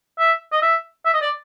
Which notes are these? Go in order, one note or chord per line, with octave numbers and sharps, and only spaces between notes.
E5
D#5
E5
E5
D#5
D5